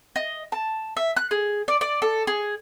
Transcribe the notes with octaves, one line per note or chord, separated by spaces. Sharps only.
D#5
A5
E5
F#6
G#4
D5
D5
A4
G#4